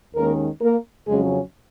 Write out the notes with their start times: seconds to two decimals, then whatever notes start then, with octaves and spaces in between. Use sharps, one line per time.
0.16 D#2 D#3 G#3 A#3 C#4 A#4
0.62 A#3 A#4
1.07 F2 C#3 F#3 G#3 C#4 G#4